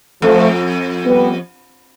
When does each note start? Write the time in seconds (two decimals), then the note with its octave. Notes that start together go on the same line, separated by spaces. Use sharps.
0.22 F2 F3 A3
1.05 G3 B3